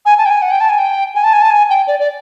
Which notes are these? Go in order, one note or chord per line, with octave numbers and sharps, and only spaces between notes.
G#5
A5
G5
G#5
F#5
G5
A5
G#5
G5
G#5
A5
G#5
A5
G#5
G5
D5
D5